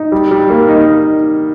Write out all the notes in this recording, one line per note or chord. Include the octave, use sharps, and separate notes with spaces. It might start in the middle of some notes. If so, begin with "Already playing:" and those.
Already playing: D#4
G3
G3
A#3
D#4